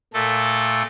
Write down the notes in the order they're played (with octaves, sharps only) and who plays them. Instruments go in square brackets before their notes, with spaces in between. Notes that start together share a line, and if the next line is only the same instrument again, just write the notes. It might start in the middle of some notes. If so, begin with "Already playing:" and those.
[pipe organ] A#2 A3 A4